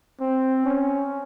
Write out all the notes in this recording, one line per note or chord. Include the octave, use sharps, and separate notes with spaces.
C4
C#4